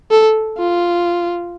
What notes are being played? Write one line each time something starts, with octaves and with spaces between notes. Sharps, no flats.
A4
F4